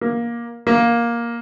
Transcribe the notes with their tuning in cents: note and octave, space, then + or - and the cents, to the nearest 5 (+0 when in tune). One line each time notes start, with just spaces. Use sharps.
A#3 +15
A#3 +10